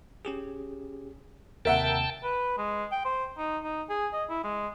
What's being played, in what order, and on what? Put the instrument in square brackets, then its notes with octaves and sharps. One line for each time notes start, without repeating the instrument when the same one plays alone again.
[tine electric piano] C#4 G4 G#4
[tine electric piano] D#2 C3 [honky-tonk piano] A#4 E5 F#5 [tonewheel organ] G5 A5
[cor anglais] B4
G#3
G5
C5
D#4
D#4
G#4
D#5
E4
G#3